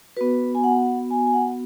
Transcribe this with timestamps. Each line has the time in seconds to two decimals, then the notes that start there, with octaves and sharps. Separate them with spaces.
0.17 B3 F#4 B4
0.55 G#5
0.64 F#5
1.10 G#5
1.27 G#5
1.34 F#5